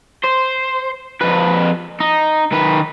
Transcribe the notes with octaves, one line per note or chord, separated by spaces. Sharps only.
C5
F2 B4
D#4
D#3 B4